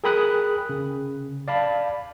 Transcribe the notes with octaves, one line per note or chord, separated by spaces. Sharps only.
G#4 A#4 G5 B5 D#6 F#6
C#3
D5 F5 A5 B5